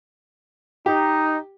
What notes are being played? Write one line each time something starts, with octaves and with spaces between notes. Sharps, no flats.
D#4 G4